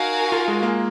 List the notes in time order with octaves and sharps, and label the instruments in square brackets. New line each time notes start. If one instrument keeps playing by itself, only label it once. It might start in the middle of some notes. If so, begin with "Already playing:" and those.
Already playing: [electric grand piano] D#4 [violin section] F#4 A#4 F5 G#5
[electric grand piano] F4
G#3
A#3